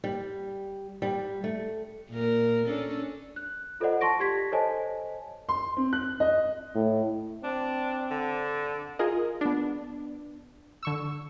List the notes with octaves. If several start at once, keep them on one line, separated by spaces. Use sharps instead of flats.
G3
G3
A3
A#2 A#4
C#4 D4 A4
F#6
F4 A4 C5 D5 D#5 F#5
A5 C6 C#6 A#6 D7
G4 G#6 B6
A4 C5 C#5 D#5 G#5 A5
C6
C4
F#6
D#5
A2
C4 D4
D3
F4 G#4 A#4 D#5
B3 D4
D3 C#6 E6